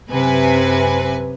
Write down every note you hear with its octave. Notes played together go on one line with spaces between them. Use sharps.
F#2 C3 B4 G#5